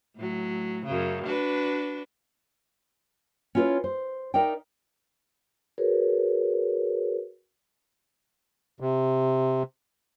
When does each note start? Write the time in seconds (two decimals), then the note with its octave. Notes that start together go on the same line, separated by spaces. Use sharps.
0.16 A2 F#3
0.86 F#2 C#3
1.24 D4 F#4 B4
3.55 C#4 E4 F4 G4 B4 C#5
3.84 C5
4.34 D#4 A#4 D5 E5 G5
5.78 F#4 G#4 A#4 B4 C#5
8.80 C3